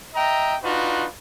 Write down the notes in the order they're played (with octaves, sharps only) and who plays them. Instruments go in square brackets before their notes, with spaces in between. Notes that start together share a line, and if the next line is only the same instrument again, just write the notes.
[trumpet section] D#5 E5 G5 A#5
D4 D#4 F4 F#4 B4